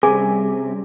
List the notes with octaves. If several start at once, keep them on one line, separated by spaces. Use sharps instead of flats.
C3 G3 C4 C#4 G#4 G#5